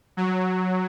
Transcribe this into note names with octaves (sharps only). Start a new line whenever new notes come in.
F#3